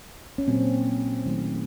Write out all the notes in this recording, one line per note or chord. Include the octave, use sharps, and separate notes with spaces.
C#4
A#2 F#3 A#3 C4
D#3 F#3 A3